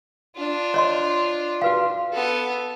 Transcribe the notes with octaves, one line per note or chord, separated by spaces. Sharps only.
D4 F4
C#5 D#5 C6
F#4 B4 F5
B3 A4